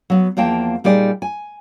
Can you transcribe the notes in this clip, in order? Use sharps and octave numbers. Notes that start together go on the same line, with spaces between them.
F#3 B3
E2 F3 A#3 G5 A5
A#2 G3 D#4 G#4 D5
G#5